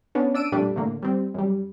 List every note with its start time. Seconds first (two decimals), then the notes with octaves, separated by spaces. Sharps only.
0.15 B3 C#4 D4
0.35 D4 E6 D7 D#7
0.52 F2 A#2 G3 A3 D4
0.76 A2 D3 A#3
1.03 G3 C4
1.34 F#2 G3